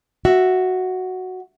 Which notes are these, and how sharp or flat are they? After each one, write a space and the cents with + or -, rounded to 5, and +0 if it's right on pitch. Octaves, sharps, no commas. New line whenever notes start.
F#4 +0 E5 +0